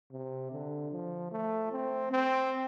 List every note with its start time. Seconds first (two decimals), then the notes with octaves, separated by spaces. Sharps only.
0.12 C3
0.52 D3
0.92 F3
1.31 A3
1.72 C4
2.11 C4